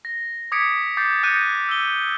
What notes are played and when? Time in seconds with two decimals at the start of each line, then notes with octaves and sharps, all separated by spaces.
0.05 A#6
0.52 D6 D#6 G#6 B6 C#7 D7
0.97 D6 G6 A6 C7
1.23 D#6 F#6 G6 A#6 C#7 D#7
1.69 E6 G7